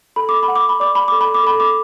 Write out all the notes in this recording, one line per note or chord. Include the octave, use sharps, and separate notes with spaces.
A4 B5
D6
B5
F#5
D6
B5
D5 D6
B5
A4 D6
B5
D6
A4 B5
D6